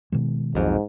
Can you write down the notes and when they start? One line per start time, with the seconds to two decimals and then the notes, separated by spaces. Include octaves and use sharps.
0.12 B2 D#3 G#3
0.55 B1 F2 G#2